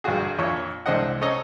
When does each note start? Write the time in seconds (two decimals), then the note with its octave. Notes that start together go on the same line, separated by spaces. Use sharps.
0.04 A#1 G2 D3 F4 F#4 G#4
0.38 F2 A#2 D4 C#5 C#6
0.86 C2 G#3 C4 D4 D#5 F#5
1.21 C4 C#4 A4 D#5 A#5